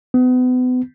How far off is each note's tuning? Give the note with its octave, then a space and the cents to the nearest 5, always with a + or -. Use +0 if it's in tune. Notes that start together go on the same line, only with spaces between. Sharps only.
B3 +35